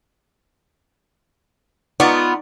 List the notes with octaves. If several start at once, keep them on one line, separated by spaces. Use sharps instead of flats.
B3 D#4 F4 D5 C#6